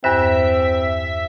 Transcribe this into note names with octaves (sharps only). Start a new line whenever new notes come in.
E2 G2 C4 E5 F#6